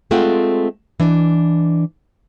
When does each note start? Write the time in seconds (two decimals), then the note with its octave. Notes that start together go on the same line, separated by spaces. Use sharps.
0.11 G#3 A3 C4 F4 F#5 G5
1.00 E3 D4